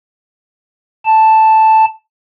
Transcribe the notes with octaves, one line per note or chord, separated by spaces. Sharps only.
A5